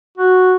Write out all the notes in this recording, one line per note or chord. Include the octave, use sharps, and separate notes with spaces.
F#4